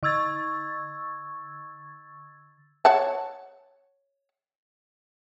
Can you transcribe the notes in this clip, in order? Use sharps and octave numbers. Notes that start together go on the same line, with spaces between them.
D3 C#6 E6 G#6 A6
C#5 F#5 A5